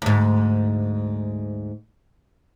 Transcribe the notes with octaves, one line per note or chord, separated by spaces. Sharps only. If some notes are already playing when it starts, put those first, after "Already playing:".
D2 G#2